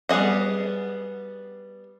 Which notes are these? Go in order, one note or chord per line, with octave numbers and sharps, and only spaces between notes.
G3 B3 G#4 D#5 F#5